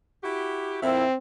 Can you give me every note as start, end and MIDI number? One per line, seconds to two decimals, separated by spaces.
0.23 0.80 64
0.23 0.80 66
0.23 0.80 67
0.83 1.04 41
0.83 1.04 46
0.83 1.16 60
0.83 1.04 64